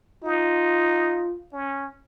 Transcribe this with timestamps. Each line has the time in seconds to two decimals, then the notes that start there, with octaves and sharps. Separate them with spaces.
0.24 D#4 F4
1.53 C#4